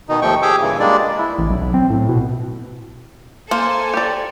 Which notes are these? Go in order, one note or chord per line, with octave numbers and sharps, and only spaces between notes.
B2 D#3 D#4
D#2 F3 A3 G5 C#6
G4 G#4 G5 D6 E6
G2 A#2 C#3 E3
G3 G#3 A#3 D4 D5
E4
A1
B1
B1
C4
A2
B2
A#3 A4 C5 G#5
G4 D5